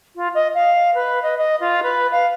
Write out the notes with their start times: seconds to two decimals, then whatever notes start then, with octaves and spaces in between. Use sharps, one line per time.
0.16 F4
0.34 D#5
0.55 F5
0.94 B4
1.22 D#5
1.38 D#5
1.60 F4
1.83 B4
2.11 F5